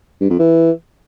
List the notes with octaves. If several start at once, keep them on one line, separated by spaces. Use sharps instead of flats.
G2
F2
E3